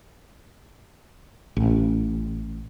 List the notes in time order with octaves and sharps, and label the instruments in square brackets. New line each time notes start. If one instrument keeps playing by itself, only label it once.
[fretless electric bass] A1